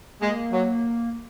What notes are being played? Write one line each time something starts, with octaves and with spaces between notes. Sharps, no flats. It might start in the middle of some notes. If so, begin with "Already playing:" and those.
G#3 A#3
F#3